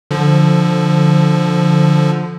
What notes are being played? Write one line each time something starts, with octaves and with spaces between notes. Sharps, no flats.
D3 F3